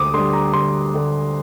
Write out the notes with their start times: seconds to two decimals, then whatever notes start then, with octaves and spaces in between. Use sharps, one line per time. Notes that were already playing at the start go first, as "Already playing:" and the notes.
Already playing: D2 D6 D#6
0.14 D3 G3 C6
0.33 A#5
0.53 D2 C6
0.94 D3 G3